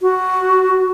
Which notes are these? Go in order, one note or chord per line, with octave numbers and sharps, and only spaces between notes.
F#4